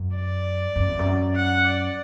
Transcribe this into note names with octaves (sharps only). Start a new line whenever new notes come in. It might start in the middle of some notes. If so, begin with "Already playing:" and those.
Already playing: F#2
D5
F#2
E2
F#2
F#5
D5